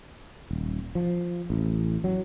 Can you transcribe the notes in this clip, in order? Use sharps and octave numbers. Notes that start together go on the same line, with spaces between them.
D#1
F3
A1
F#3